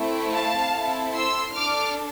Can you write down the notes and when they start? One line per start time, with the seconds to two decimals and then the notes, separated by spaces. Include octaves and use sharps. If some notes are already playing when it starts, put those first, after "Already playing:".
Already playing: A3 C4 E4
0.32 F5 A5
0.74 C4 E4 A4
1.14 C6 E6
1.55 D4 A4 D6 F6